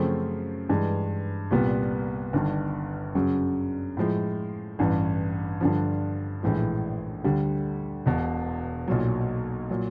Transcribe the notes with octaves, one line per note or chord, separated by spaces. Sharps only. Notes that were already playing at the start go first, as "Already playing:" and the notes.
Already playing: F#2 C#3 F3 A3 C4
G2 E3 G#3
C2 A#2 G3 B3
G1 G2 D#3
F#2 C#3 F#3
A2 F3 G#3
A1 G2 E3
G2 D3 F3
A#1 A2 E3 G#3
D2 D3 G3
E1 E2 B2
B1 A#2 F#3
A#2 F#3